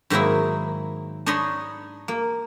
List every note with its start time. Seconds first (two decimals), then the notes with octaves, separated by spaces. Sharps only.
0.10 G#2 D#3 F#3 A#3 E4
1.26 D4 D#4 C#5 D#5 B5 C6
2.08 A#3